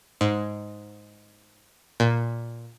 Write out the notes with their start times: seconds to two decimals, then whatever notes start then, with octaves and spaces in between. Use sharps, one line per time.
0.21 G#2
2.00 A#2